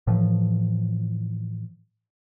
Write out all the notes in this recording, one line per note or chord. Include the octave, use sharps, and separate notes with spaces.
A2 E3 F3